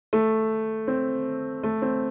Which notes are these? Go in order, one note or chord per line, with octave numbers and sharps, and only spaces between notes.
A3
C4
A3
C4